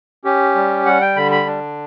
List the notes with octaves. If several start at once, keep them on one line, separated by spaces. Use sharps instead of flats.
C#4 G4
G3
G3 F#5
G5
D3 B5
B5
D4